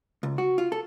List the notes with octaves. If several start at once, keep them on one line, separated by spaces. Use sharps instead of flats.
C#2
F#4
F4
A4